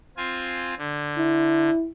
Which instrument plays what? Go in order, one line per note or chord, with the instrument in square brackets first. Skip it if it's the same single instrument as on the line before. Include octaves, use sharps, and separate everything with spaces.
[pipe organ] C4 F4 G#5
D3
[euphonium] E4